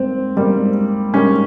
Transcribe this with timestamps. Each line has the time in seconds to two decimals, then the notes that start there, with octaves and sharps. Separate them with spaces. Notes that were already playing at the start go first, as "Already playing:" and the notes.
Already playing: G#2 G3 A#3 C4
0.36 G#2 G3 A#3
1.14 G#2 G3 A#3 C#4